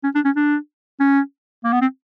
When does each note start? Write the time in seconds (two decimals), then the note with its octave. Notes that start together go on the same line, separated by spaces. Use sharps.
0.04 C#4
0.15 D4
0.25 C#4
0.36 D4
1.00 C#4
1.65 A#3
1.73 B3
1.81 C4